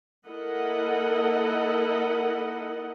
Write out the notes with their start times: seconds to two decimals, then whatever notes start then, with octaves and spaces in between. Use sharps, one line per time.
0.26 A#3 E4 A4 A#4 D#5 F#5